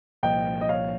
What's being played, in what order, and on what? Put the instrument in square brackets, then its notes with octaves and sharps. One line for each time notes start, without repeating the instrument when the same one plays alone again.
[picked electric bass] C2 A#2 F3 A#3 [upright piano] D#5 G5
[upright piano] D#5
C#5 F5